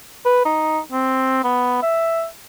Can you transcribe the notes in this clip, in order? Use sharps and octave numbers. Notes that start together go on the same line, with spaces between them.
B4
D#4
C4
B3
E5